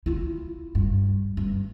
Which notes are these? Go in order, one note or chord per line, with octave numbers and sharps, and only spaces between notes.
E4 F4
G2
G2